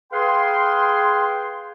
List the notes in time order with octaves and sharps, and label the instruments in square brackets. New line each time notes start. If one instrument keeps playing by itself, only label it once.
[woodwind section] G#4 B4 F5 G5 C6